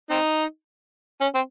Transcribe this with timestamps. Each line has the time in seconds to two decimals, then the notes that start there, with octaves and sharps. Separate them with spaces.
0.11 C4 D#4
1.21 C#4
1.35 C4